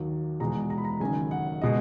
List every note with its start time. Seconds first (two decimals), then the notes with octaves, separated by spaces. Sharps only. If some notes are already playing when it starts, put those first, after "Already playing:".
Already playing: D#2 D#3 F#3
0.40 E2 B2 G#3 A#5
0.70 A#5
0.78 B5
0.85 A#5
1.00 F#1 F#2 D#3 G#5
1.31 F#5
1.62 B2 G#3 D#5